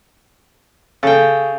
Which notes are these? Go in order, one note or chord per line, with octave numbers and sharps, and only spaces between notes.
C#3 A4 G5